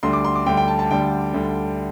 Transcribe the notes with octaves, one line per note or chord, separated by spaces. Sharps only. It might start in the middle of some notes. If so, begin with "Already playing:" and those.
D2 D3 G3 C6
D6
C6
D6
D2 D3 G3 G5
G5
A5
A5
D2 D3 G3 G5
D2 D3 G3